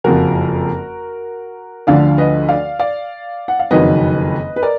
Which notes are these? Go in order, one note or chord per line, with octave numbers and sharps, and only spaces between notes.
F#1 F2 F3 F#4 A#4
D2 D3 F3 D5 F5
B4 D#5
D5 F5
D5 F5
F#5
F5
F#1 F2 D#3 F#3 B4 D#5
B4
A#4 D5